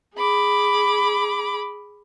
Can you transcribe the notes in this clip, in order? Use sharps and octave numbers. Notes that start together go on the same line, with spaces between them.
G#4 B5 D6